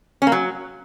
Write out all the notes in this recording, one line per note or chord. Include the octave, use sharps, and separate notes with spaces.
C#4
A#3
F#3